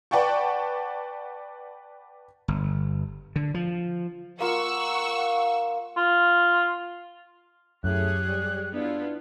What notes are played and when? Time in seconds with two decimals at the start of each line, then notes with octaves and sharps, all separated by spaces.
0.11 B4 D5 F#5 G5 A5 C#6
2.48 G1
3.36 D3
3.54 F3
4.40 A#3 F4 F#5 C#6 E6
5.96 F4
7.84 F#2 A2 G4 G#4 C#5 F#6
8.27 G3
8.73 B3 D4 E4 F4